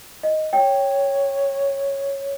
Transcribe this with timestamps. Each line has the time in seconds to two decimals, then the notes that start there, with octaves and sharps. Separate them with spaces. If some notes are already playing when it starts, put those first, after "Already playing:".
0.23 D#5
0.53 C#5 G5